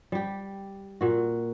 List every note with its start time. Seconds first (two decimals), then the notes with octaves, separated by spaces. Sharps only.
0.12 G3 G4
1.01 A#2 F#4